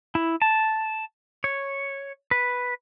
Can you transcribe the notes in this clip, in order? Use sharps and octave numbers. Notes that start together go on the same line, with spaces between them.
E4
A5
C#5
B4